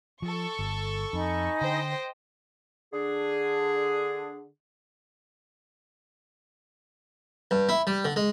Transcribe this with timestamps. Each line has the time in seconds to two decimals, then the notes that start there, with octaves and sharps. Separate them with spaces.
0.22 F3 A4 C#6
0.59 G1
1.13 F2 D#4 G#5 B5
1.61 D3 C5 D#5 G5
2.93 D3 D4 G#4
7.51 G2
7.69 E4
7.87 G3
8.05 D3
8.16 G#3